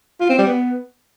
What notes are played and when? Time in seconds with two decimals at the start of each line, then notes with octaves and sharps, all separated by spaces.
0.21 F4
0.29 C4
0.38 G3
0.47 B3